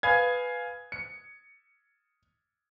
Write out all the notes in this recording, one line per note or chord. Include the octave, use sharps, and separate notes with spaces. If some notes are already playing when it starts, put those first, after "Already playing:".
B4 F5 G#5 D#6 G#6
C#7